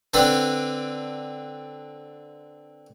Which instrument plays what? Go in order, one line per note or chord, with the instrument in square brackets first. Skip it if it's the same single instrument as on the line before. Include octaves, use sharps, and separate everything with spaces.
[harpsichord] D3 C4 D4 B4